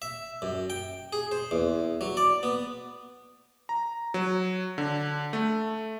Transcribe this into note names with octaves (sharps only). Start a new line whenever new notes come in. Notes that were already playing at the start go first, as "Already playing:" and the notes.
E5
F#2
G5
G#4
C5
E2
F#3
D5
B3
A#5
F#3
D3
A3